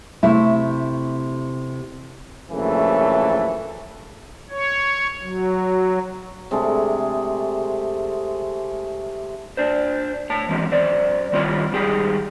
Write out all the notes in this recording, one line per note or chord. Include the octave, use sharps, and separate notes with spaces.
C3 A3 E4
A#1 F#2 C#3 E3 A3
C#5
F#3
C3 G#3 A3 D4
D4 C5
A2 C#5 A5
E3 F#3 G#3 C4
F#2 C5 D5
D#3 G3 C4 E4 F4 C#5
G#2 D#3 G3 G4 G#4 G5